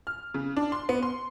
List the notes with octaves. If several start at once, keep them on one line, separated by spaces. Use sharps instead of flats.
F6
C#3
D4
C6
B3
C6